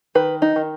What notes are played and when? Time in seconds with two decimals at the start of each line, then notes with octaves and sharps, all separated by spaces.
0.15 D#3 B4
0.42 D#4
0.56 D#3